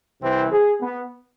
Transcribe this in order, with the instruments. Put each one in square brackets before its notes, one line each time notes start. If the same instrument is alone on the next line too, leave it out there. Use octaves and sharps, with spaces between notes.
[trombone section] C2 C3 E3 C4
G#4
B3